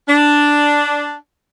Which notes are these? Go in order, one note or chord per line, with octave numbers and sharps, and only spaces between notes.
D4